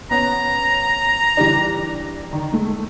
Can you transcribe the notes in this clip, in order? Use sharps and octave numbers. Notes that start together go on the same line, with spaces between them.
B3 C#4 A#5
E3 G3 D4
D#3
G#3 A3